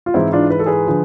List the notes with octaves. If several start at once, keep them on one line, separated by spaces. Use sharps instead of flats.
F4
G#2 E3 C4 E4
D4 F4
B4
A4
G#4 B4
D3 F3